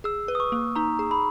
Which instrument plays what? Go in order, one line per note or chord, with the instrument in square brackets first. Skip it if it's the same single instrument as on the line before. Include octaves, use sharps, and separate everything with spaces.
[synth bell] G#4 [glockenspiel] E6
[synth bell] B4
[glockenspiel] D#6
C#6
[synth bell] A#3
[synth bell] D#4 [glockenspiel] A#5
[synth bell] G#4
[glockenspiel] B5